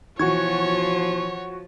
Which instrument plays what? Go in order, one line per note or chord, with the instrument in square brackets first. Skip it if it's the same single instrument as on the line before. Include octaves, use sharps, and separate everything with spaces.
[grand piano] B2 E3 [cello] F3 F4 [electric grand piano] F#4 C#6 G#6 [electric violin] C#5